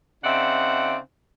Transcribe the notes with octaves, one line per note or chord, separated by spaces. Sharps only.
C#3 C4 D#4 D5 E5 F#5